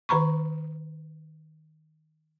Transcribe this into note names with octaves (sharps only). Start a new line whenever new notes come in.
D#3 B4 A#5 B5 C#6